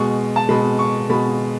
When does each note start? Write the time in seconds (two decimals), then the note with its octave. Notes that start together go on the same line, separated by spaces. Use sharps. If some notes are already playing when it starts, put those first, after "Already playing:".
Already playing: B2 G#3 C#6
0.36 A5
0.49 B2 G#3 B5
0.79 C#6
1.09 B2 G#3 B5